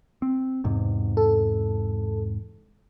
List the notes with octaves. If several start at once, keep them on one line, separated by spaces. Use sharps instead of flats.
C4
E2 G#2 C3
A4